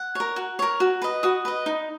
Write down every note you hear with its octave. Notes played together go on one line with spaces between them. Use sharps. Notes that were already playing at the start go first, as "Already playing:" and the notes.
Already playing: F#5
A#4 C#5
F#4
A#4 C#5
F#4
B4 D#5
F#4 D#6
B4 D#5
D#4